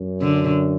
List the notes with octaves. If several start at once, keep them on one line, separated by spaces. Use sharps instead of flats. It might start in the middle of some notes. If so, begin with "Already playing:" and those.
Already playing: F#2
D3